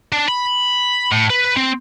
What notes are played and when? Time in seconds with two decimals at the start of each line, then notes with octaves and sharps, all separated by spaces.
0.13 D4
0.28 B5
1.12 A2
1.30 B4
1.57 C4